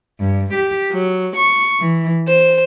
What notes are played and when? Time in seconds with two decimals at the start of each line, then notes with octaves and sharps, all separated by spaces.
0.20 G2
0.53 G4
0.92 F#3
1.36 C#6
1.79 E3
2.26 C5